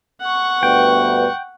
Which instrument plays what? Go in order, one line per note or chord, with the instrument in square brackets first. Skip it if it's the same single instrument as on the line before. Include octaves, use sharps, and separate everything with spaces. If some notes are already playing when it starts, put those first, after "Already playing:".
[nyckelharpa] F#5 C#6
[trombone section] D2 G2 B3 [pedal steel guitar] G5